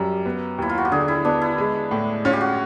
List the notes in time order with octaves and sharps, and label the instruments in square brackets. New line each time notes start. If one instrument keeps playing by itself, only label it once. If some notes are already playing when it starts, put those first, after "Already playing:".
Already playing: [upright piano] F#2 G3 [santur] G4
[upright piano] B3
[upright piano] D#2 [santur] E4
[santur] F4
F#4
G4
[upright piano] D3 [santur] G#4
[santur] E4
[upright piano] B3 [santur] D4
[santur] E4
[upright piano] G#3
A2
[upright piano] C#4 [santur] F4
[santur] G4
F#4